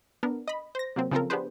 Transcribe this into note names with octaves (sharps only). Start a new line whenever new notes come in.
B3 D4 A#4
D#5 B5
C5 A#6
C3 F#3 A#3 C4
C#3 F3 C4 F4 A4 A#4
B3 D4 G4 G#4 B4 C5